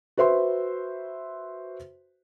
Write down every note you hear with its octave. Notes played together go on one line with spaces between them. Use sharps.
F#4 B4 C5 E5 C6